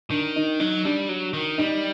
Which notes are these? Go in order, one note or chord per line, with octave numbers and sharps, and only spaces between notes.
D#3 D4
D#4
F#3 D#4
G3 D4
F#3
D#3
G3 D#4